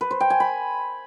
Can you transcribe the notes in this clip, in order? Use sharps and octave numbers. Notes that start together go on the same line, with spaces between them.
B4
C5
G5
G#5
B5